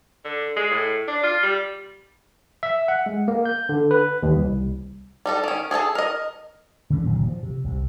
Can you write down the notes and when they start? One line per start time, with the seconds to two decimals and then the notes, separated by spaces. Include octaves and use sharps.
0.25 D3
0.56 G#3
0.70 A2
1.08 D4
1.23 F4
1.43 G3
2.63 E5
2.88 F#5
3.06 G#3
3.28 A#3
3.46 G6
3.69 D3
3.91 B4
4.23 D#2
4.35 C2
5.26 G3 D#4 A4
5.44 D#3 C#4
5.71 G#4 A4 C#5 A5
5.95 A#4 D#5
6.90 D3 E3 C#4
7.03 F#1 A#2 D#3 F#3
7.25 F3
7.43 C3
7.64 C2 C3